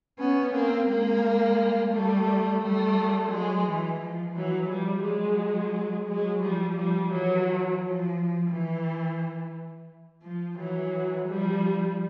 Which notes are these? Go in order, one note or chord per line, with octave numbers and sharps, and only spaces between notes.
B3 C#4
A#3 C4
G#3 A#3
G3 A3
G3 A3
F#3 G#3
E3
F3
E3 F#3
F3 G3
F#3 G#3
F#3 G#3
F3 G3
F3 G3
E3 F#3
F3
E3
F3
E3 F#3
F3 G3